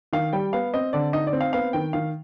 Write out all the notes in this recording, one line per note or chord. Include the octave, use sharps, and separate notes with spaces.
D#3 F5
G3 G5
B3 F5
C4 D#5
D3 D5
D#4 D#5
D5
C4
F5
B3 F5
D#3 G5
D#3 F5